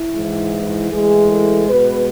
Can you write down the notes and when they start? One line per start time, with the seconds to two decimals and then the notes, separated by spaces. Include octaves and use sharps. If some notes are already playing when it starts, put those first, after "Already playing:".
Already playing: E4
0.14 G#2 E3 G#3
0.91 A2 E3 G#3 G#4
1.31 A4
1.69 B2 G#3 B4